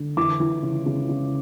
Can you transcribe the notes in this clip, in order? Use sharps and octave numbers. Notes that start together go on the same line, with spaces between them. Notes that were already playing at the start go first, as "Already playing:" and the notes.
Already playing: D3
E3 D6
E3
C#3
C#3
C#3